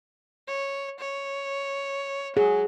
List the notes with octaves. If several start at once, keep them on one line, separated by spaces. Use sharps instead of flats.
C#5
C#5
F#3 G#4